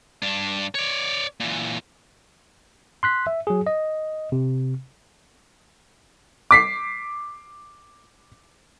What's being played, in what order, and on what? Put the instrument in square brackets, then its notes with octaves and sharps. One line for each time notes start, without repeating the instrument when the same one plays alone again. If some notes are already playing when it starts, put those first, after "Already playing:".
[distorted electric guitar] G2 D4
C#5 D5
A#2 E3
[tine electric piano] C6 F#6 B6
E5
F#3 G#4
D#5
C3
[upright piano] D6 B6 C7